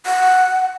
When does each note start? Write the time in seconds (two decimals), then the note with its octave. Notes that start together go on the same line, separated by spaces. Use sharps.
0.06 F#5